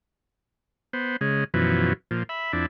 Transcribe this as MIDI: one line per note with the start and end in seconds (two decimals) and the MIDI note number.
0.93 1.16 59
0.93 1.16 72
1.21 1.44 49
1.21 1.44 56
1.54 1.93 42
1.54 1.93 47
1.54 1.93 52
1.54 1.93 53
2.11 2.23 46
2.11 2.23 53
2.29 2.52 76
2.29 2.52 83
2.53 2.66 41
2.53 2.66 62
2.53 2.66 64